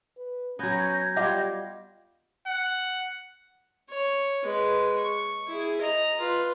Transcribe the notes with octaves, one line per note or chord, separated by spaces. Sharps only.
B4
F#3 B3 C#4 G6 G#6 A#6
G3 F4 D#5 F#5 D6
F#5
C#5
G#3 B4
C#6
E4 G#4
D#5 A#5
F4 B4